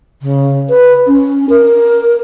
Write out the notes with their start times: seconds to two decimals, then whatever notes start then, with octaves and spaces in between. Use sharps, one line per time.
0.22 C#3
0.69 B4
1.07 C#4
1.49 A#4